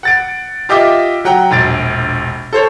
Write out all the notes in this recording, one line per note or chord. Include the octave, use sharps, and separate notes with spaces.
F#5 A6 D7
F4 G4 D#5 E5 G5 D6
F#3 F#5 G5 A#5
E1 A#1 A6 D7
A4 C5 C#5